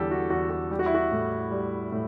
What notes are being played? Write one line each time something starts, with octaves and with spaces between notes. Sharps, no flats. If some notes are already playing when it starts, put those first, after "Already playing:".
Already playing: E2 D3 G3 G4 A4
F#4
E2 F#4
F#4
G3 G4
F#4
E4
F#4
A2
G3
A2